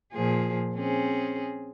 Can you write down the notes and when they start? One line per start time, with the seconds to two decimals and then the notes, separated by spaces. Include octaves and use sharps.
0.13 A#2 F3 G#4
0.75 C4 C#4 G#4